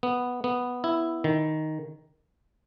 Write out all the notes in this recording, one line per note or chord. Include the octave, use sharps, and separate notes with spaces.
B3
B3
E4
D#3